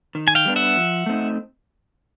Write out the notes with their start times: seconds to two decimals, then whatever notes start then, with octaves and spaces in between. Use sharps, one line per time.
0.15 D#3
0.28 G#5
0.35 F5 G5
0.45 G3 B3 D4
0.56 E5 F#5
0.76 F3
1.06 A3 C4 D#4